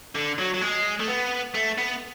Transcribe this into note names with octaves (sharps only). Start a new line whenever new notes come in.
D3
F#3
F#3
G#3
A3
B3
A3
B3